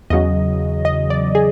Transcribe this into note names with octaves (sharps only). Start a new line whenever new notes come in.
E2 C#3 F#3 D#5
D#5
D5
G#4